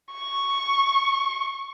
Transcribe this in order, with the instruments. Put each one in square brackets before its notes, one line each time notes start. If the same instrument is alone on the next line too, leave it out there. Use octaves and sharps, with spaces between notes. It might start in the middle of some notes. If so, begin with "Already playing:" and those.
[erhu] C#6